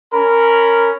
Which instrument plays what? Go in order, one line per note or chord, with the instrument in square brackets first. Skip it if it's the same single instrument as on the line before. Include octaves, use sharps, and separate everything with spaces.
[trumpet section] C#4 A#4 B5